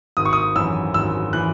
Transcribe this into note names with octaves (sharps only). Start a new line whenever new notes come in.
G#1 D#6
C#6
D#6
F#2 E3 E6
G#1 E6
E3 F#6